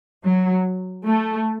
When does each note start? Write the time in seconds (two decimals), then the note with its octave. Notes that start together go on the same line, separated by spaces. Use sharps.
0.23 F#3
1.06 A3